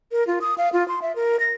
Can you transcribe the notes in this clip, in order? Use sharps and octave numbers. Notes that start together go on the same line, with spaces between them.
A#4
F4
D#6
F5
F4
C6
E5
A#4
A#6